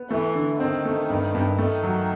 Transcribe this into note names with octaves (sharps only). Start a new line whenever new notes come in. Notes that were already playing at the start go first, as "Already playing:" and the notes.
Already playing: B3
E3 A3
D3
D#3 C4
A3
G2
G2
D#3 A3
F#3